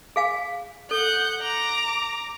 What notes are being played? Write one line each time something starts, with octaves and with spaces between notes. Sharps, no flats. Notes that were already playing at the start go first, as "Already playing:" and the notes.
G#4 F5 G#5
A4 F#5 G6
A#5 D6